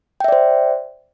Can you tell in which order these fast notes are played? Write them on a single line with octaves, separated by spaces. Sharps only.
G5 E5 D5 C5